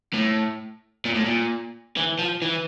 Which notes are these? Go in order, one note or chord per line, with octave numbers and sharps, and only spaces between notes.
A2
A#2
A2
A#2
E3
F3
E3